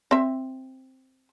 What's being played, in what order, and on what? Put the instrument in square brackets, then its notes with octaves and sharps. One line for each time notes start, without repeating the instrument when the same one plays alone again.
[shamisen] C4 E5